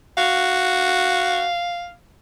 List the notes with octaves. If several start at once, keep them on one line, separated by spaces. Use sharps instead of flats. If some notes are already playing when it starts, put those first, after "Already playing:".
F#4 F5